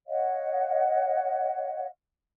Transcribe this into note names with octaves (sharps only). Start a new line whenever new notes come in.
C#5 D#5 F5 F#5